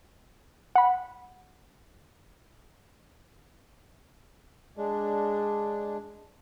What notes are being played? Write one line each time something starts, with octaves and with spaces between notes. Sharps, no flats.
F#5 B5
G#3 D4